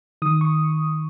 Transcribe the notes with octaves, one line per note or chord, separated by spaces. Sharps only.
D#3 D#6
C#6